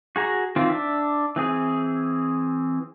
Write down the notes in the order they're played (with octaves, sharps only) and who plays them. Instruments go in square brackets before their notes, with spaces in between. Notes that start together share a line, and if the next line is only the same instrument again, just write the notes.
[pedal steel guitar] F#4 G#4 A#5
D#3 E3 C4 F4
D4 E5
E3 C4 G#4